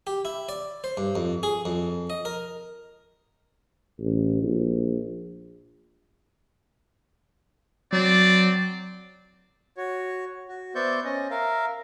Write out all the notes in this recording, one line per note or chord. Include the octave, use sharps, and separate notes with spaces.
G4
E4
D5
C5
G2
F2
G#4
F2
D#5
A#4
A1
A#1
F#3 C4 D5
F#4 C#5
F#4
B3 C5 D5 E5 C#6 G6
C#4 D#5
A#4 E5 F5